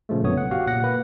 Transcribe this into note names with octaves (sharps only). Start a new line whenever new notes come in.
A#2 C#3 F3 G#3 A3
B1 F#2 D3 B3 C#5 D#6
F#5
F#4 G4 F5 F#5
A#2 F#5 A#6
A#3 B4